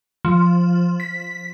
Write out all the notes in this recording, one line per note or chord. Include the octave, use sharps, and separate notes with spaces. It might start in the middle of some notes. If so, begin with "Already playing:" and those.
F3
B6